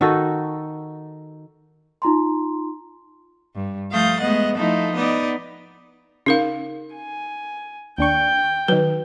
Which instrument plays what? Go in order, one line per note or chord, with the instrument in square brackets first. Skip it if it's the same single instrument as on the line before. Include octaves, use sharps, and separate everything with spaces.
[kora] D#3 D#4 F#4 A4
[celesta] D#4 F4 A#5 C6
[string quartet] G2
F3 A3 F5 D#6 G6 A6
G#3 A3 B3 D#5 F#5
F3 A3 D#4 E4 A4
B3 D#4 D5 D#5
[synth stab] C#3 [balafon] D#4 A#4 F5
[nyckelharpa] G#5
[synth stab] D#2 D4 C#6 [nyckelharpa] G5
[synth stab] D#3 F#3 [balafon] B4